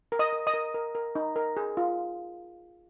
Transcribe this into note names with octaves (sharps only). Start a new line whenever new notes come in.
A#4
D#5 D#6
A#4
D#5 D#6
A#4
A#4
A#4
D#4
A#4
G#4
F4